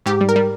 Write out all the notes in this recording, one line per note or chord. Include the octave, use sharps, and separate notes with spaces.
G#2 G4
G3
A#4
G3